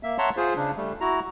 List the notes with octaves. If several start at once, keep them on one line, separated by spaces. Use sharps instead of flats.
A#3 E5
C#5 E5 F#5 A5 A#5 C6
F4 G#4 C5
C#3 D4
G3 A3
E4 F#4 A#5